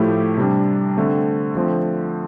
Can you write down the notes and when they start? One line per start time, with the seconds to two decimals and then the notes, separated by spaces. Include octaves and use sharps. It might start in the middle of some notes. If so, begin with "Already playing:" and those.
Already playing: A2 F3 A3 E4 G4
0.37 C3 G3 D4
0.97 D3 A3 C4
1.55 D3 F3 A3 C4